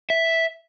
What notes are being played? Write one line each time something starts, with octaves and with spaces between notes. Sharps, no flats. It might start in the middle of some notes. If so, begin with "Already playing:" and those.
E5